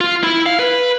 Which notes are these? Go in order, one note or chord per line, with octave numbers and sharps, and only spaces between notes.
F4
E4
F5
B4